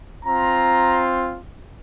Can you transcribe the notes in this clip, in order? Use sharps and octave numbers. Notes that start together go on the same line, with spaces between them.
C4 F4 A#5